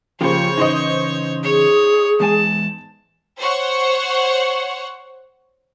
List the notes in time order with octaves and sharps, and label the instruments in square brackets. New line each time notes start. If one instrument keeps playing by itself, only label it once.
[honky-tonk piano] C#3 C5 [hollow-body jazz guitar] F3 A#3 G4 [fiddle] C#5 C#6
[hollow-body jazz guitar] C#3 E3 [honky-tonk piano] D#4 C5 D#5
[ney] G#4 [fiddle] C#5
[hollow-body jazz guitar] E2 G#3 G#5 [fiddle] A5
[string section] C5 C#5 F#5 C#6